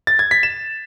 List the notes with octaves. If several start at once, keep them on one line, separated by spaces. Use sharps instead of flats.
A6
G#6
B6
E7